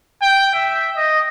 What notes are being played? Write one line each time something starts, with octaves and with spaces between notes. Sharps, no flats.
G5
E5
D#5